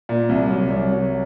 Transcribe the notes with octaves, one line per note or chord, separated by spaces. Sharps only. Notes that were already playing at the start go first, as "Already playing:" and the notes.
A#2
C2
F#3
C2
F#3